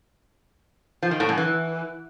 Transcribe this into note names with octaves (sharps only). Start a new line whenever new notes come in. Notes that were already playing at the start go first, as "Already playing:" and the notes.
F3
D#3
A2
F#2
E3